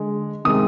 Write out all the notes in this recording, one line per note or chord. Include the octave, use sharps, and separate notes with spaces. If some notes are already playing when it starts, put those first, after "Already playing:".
Already playing: D3 G#3
C3 D#3 G#3 D#6